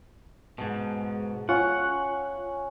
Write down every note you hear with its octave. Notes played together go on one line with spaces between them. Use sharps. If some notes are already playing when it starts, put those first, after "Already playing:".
G#2 B2 A5
C#4 F4 F#5